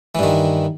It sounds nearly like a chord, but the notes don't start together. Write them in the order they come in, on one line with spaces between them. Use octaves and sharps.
E3 G2 D#3